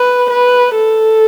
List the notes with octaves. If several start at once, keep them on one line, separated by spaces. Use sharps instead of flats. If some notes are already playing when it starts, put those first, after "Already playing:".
Already playing: B4
B4
A4